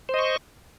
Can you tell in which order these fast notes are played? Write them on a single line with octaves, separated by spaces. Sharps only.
C5 D#5 C#6